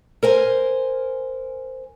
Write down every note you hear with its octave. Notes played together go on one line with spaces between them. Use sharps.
A#4 C5 G#5